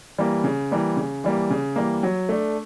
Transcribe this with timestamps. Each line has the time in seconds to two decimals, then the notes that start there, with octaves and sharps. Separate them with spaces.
0.18 E3 G3 A#3
0.44 C#3
0.71 E3 G3 A#3
0.97 C#3
1.24 E3 G3 A#3
1.50 C#3
1.76 E3 G3 A#3
2.03 F#3
2.29 A3 D4